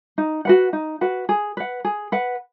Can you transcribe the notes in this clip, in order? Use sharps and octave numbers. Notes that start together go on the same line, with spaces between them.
D#4
F#4 B4 F#5
D#4
F#4 B4 F#5
G#4
B4 F#5
G#4
B4 F#5